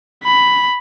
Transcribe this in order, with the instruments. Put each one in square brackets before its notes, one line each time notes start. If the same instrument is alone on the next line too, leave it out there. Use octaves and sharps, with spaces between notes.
[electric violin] B5